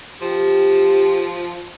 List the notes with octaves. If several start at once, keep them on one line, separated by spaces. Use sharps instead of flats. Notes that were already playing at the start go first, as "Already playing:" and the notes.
F3 G4